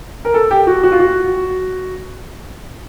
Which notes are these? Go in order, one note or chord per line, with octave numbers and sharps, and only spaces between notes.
A#4
A4
G4
F#4
F#4
F4
F#4